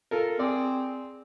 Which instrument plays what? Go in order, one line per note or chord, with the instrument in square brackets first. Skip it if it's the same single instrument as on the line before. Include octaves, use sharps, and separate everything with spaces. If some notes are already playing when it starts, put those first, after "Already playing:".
[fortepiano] F4 A4 A#4
[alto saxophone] C4 [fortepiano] G#4 D5